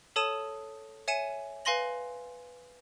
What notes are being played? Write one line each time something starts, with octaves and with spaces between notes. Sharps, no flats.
A4 C#5 A5 D#6 D#7 E7
C#5 E5 G#5 C#7 D#7 E7
B4 F5 G#5 C6 A#6 F#7